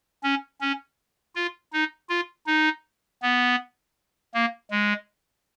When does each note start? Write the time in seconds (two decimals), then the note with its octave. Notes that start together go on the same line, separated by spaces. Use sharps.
0.24 C#4
0.61 C#4
1.36 F4
1.73 D#4
2.10 F4
2.47 D#4
3.22 B3
4.34 A#3
4.71 G#3